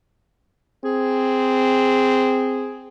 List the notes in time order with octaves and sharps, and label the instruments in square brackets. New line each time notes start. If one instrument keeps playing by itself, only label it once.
[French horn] C4 [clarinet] G#4